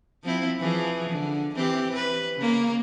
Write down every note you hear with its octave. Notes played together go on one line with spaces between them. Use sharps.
F3 C4 E4
E3 F3 G#4
D3
E3 C4 G4
B4
C#3 A#3